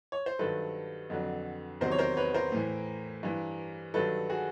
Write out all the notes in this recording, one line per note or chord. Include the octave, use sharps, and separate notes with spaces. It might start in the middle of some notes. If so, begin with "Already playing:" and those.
C#5
C5
G2 D#3 F#3 A4 B4
F2 D3 F#3
E2 C3 D#3 F#3 A#4 C5
C#5
A#4 C5
B4 C#5
A#4 C5
A2 E3
G2 E3
G2 D#3 F#3 A4 B4
F#4 G#4